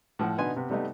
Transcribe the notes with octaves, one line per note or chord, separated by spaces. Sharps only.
A2 F3 F#5
B2 D3 B3 D#4 G#5 C6
C3 B3
C3 G3 A3 B3 D#4